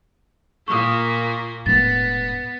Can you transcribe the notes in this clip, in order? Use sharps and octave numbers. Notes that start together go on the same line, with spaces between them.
A#2 A#3 C#6 D#6
E1 A2 B3 A6